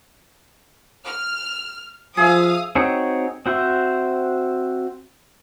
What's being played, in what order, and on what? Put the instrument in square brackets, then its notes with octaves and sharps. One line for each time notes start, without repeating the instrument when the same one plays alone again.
[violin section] F6
[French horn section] F3 [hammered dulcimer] G#4 E5 [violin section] F5 D#6
[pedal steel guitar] C4 D#4 F#4 G#4 C#5
C4 F#4 C5 E5